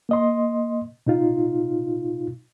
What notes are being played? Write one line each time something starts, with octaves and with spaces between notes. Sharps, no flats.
A#3 D#5 C6
B2 D#4 F4